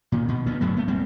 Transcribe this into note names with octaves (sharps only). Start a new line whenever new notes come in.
A#2 D#3
B2
D2 B3
G1 A2 F#3 A3
A3 B3
D#1 G3 C4